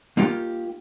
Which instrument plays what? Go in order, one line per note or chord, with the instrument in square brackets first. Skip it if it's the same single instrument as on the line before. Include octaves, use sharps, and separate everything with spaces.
[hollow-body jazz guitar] A#3 D#4 F4 G4